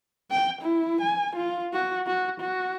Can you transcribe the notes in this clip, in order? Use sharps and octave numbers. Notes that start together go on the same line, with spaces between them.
G5
E4
G#5
F4
F#4
F#4
F#4